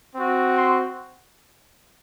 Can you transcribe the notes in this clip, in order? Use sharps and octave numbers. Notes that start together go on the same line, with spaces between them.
C4 F#4
C6